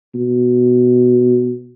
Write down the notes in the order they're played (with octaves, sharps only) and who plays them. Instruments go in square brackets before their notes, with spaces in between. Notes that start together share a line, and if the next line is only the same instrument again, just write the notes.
[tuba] B2